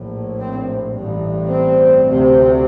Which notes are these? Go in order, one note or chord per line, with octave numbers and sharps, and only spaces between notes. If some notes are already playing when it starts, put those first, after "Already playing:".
Already playing: A#1 A2
C4
A1 G2
C4
D2 C3